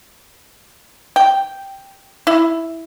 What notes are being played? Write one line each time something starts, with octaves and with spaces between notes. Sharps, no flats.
G5
E4